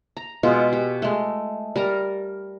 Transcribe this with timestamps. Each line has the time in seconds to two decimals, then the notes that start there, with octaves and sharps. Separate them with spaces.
0.17 A#5
0.43 B2 G#3 F4
0.73 G4
1.02 G#3 A3
1.76 G3 A#4 A#5